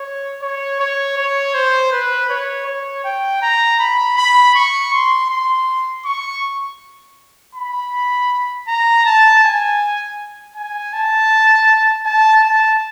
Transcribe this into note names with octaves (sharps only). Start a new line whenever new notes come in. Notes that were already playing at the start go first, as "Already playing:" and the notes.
Already playing: C#5
C#5
C#5
C#5
C5
B4
C#5
C#5
G5
A#5
B5
B5
C#6
C6
C6
C#6
B5
A#5
A5
G#5
G#5
A5
A5
A5